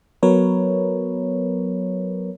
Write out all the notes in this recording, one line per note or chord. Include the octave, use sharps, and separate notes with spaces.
F#3 B3 A#4 B4 C#5